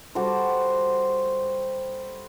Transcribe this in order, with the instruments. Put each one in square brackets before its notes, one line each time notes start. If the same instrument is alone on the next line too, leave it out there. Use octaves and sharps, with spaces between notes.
[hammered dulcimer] G3 F#4 A4 C5